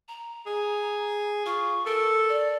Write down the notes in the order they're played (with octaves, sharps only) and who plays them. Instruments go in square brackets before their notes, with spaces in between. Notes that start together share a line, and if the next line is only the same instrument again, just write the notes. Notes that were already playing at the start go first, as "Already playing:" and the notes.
[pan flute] A#5
[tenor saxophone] G#4
[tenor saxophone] F4 [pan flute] C#6
[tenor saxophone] A4 [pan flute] A#4
[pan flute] D5